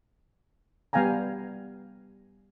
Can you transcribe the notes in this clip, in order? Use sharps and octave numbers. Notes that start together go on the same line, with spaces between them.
G3 B3 F5 G5 G#5 A#5